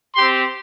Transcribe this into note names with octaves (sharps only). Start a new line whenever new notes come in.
G4 C6
C4